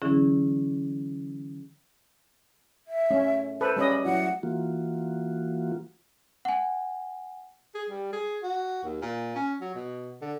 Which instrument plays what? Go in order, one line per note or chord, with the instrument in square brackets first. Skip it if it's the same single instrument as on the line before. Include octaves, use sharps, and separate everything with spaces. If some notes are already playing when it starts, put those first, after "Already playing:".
[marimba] D3 E3 F#3 C#4 E4 G#4
[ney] E5
[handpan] A3 [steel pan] C#4
[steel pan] A4 B4 [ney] C5
[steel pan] G3 C#4 D#5 [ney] B5
[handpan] F#3 E4 F#4 [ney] F#5
[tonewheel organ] E3 A#3 F4 F#4
[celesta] F#5 G#5
[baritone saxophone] G#4
G3
G#4
F#4
D#2
A#2
C#4
F#3
B2
D3